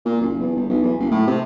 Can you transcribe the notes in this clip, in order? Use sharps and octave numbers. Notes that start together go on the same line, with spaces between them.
A#2
F#1
E2
G1
B1
E2
F#1
A2
C3